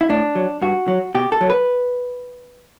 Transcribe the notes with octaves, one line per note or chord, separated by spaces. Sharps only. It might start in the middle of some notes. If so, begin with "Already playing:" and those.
E4
A2 D4
F#3
G2 F#4
F#3
B2 G4
A4
F#3
B4